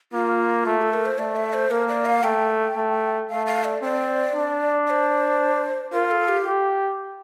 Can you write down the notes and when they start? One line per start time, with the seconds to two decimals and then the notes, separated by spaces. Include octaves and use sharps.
0.13 A#3 F4
0.66 A3
0.81 A4
0.93 A#4
1.06 C5
1.18 A3 D5
1.36 E5
1.53 C5
1.71 A#3 A#4
1.88 D5
2.06 F5
2.23 A3 G5
2.76 A3
3.29 A3 F5
3.47 F5
3.64 D5
3.82 C4 D5
4.34 D4
4.87 D5
4.90 C5
5.93 F4 A#4
6.11 A4
6.28 G4
6.46 G4